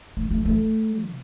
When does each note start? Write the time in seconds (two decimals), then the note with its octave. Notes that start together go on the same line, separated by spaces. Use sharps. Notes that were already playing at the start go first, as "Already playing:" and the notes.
0.17 A3
0.31 A3
0.45 A3
1.03 C3